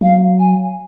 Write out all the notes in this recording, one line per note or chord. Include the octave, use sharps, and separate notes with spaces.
F#3 F5
G#5